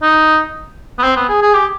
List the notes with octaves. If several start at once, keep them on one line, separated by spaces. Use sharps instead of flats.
D#4
B3
C4
B3
G#4
G#4
G4